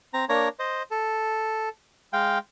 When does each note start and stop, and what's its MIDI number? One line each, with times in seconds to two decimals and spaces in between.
0.14 0.25 60
0.14 0.25 82
0.29 0.48 58
0.29 0.48 62
0.29 0.48 73
0.29 0.48 82
0.59 0.83 72
0.59 0.83 75
0.91 1.69 69
2.13 2.38 56
2.13 2.38 77
2.13 2.38 79